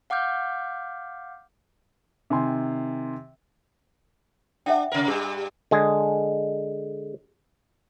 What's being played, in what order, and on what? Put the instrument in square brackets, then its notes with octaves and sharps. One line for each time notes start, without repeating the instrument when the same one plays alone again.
[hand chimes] F5 F#5 D6 F6 G6
[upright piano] C3 D#3 G#5 C6
[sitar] D4 [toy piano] E5 F#5 G5
[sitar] C3 A#4
[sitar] G2 G3 [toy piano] G#4
[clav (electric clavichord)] D3 G#3 G#4